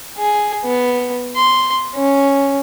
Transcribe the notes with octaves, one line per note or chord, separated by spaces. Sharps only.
G#4
B3
C6
C#4